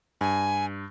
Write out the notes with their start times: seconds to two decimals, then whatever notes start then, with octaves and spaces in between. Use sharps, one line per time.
0.21 G2 G#5